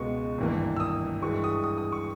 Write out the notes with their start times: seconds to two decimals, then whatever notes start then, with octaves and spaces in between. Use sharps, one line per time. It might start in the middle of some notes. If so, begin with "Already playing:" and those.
Already playing: C#2 B2 G#3 B3 C#6
0.38 G#1 G2 E3 A#3
0.76 E6
0.80 D#6
1.22 G2 E3 G#3 C#6
1.44 D#6
1.64 D#6
1.78 D#6
1.92 C#6